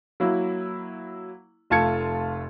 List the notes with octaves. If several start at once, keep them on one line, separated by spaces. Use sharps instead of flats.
F#3 A#3 E4
F1 A3 F4 A5 G#6 C#7